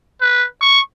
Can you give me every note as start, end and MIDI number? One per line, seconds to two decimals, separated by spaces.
0.22 0.45 71
0.61 0.80 85